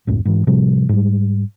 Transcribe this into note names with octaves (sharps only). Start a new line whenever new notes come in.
C#2 F#2 A2
G#2 E3
A2 C3 F3 G3
G#2 G3